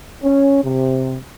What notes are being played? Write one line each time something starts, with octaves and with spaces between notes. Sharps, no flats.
C#4
C3